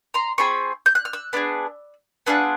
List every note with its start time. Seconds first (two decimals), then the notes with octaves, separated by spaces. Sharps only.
0.14 A#5 C6
0.38 C4 F4 G#4 B5 C#6
0.86 G6
0.95 F#6
1.05 F6
1.13 E6 F#6
1.33 B3 D4 F4 G#4
2.26 B3 D4 F4 G#4 E6 F#6